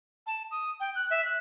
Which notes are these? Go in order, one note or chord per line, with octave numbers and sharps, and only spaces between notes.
A5
D#6
G5
F#6
E5
F#6